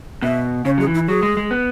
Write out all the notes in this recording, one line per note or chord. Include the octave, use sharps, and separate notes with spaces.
B2 E5
C#3 C#5
F#3 G#4
E3
E4
F#3 G#4
G#3
G#3
B3